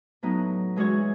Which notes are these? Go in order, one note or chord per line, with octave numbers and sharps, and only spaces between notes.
A2 F#3 B3 D#4
E3 G#3 C#4 F#4 C#5